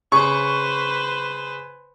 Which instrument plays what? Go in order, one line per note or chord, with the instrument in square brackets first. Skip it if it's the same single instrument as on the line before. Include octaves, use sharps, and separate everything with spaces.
[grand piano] C#3 [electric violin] B4 C5 [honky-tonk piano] C#6